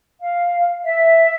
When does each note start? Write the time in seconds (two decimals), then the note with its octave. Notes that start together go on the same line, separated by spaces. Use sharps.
0.18 F5
0.83 E5